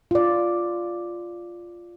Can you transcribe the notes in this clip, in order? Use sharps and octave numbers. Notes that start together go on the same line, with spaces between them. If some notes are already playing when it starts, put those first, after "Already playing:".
F4 D5